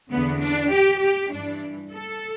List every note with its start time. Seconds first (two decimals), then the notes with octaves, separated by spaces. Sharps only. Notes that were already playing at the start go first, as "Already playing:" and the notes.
0.11 E2 D3 B3
0.42 D4
0.72 G4
1.02 G4
1.32 G2 E3 D4
1.92 A4